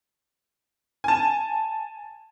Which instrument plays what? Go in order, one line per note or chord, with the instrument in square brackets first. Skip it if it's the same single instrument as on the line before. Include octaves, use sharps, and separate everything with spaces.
[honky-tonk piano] G#5 A5